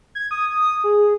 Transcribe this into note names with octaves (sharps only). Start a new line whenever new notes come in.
G#6
D#6
G#4